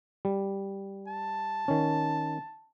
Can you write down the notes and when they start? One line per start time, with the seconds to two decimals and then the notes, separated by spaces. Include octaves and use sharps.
0.25 G3
1.08 A5
1.68 D#3 C#4